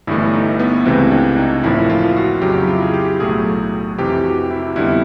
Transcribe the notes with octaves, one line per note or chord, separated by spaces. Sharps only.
G1 G2 E3 A3 E4
D#4
B3
C#2 C3 E3 A3 C4
D4
D#4
A1 A2 F3 A#3 E4
F4
F#4
F2 C#3 F#3 G4
E4
F4
G#4
G4
B1 A2 F#3 A3 G#4
F2 C3 E3 G4
F#4
E4
F2 D3 G3 B3 E4